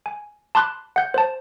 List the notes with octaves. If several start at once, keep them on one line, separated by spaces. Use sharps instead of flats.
G#5
A5 B5 C6 D6 F#6
F#5 G6
C5 A5